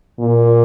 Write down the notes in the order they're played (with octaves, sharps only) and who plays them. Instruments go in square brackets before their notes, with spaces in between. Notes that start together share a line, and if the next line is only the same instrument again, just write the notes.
[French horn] A#2